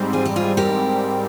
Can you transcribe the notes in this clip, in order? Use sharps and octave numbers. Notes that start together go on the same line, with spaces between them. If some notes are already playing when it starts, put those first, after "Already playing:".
Already playing: G#2 G3 C4
F4 G#4
G4
F4 G#4
G4 A#4